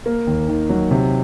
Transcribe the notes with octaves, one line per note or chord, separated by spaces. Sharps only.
A#3
D#2
D#3
F#3
C3